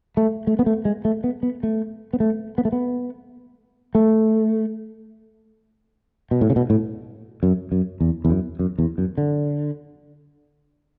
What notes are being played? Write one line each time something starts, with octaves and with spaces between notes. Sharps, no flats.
A3
A3
B3
A3
G#3
A3
B3
B3
A3
B3
A3
B3
A3
B3
A3
B2
A2
C#3
B2
A2
F#2
F#2
E2
E2
F#2
F#2
E2
F#2
D3